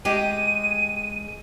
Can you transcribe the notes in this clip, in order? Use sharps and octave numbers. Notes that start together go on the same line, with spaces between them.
G#3 G4 D#7